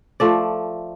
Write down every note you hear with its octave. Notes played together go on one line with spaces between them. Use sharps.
F3 A3 D5